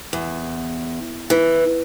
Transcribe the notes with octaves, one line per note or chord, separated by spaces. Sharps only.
E2
E3